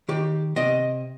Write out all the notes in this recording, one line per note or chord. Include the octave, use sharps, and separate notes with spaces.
D#3 G4
C3 D#5